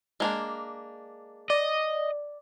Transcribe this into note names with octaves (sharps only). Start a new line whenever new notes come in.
G#3 A#3 D4
D5 D#5